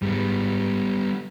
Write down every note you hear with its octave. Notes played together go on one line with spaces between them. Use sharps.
G#2 G3 B3